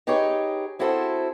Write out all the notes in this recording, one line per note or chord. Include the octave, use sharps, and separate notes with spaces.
D#4 G4 G#4 B4 C#5
C4 E4 F#4 G#4 A4 C5